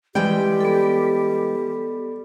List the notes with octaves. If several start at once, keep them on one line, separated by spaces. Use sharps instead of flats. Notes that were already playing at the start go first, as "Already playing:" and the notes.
E3 G3 G#3 G4 G5
B3 A4